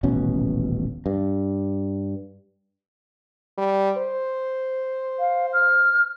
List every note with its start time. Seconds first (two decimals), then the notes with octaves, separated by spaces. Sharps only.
0.03 D#1 A1 B2 C#4
1.06 G2
3.58 G3
3.98 C5
5.19 F5
5.53 F6